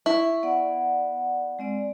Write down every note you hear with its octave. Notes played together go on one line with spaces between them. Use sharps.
E4 C#6
B3 D5 F#5
G#3 C4 D5